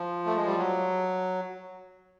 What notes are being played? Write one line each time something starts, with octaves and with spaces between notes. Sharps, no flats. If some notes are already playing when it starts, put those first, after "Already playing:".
Already playing: F3
A3
G#3
G3
F#3